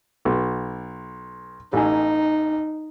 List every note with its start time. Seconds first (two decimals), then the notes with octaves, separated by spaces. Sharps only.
0.25 B1
1.73 A1 D#4 G#5